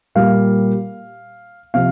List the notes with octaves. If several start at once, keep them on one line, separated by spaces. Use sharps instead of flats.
A#2 G3 A#3 F5
C3 F3 F5